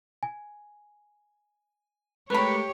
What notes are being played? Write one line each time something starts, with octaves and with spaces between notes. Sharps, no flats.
G#5
G#3 A3 G4 A#4 B4 C#5 B5